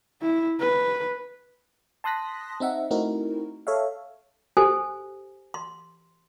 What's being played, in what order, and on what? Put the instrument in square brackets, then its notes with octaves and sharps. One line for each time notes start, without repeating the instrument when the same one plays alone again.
[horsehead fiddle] E4
B4
[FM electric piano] A5 C6 D#6 F#6 A#6 B6
C4 D#4 E5 F#5
A3 C4 D#4 E4 F#4 A#4
A4 C#5 E5 F5
[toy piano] G4 A4 C5 G#5
C6